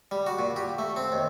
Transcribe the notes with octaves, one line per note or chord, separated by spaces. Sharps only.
G3
F#4
A#2
G4
A3
C4
D#2